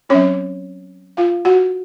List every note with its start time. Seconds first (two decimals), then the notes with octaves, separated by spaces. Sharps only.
0.09 F#3 C4 C#4 C#5
1.17 F4 F5
1.45 F#4 F#5